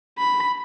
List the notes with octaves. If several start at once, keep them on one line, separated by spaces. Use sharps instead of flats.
B5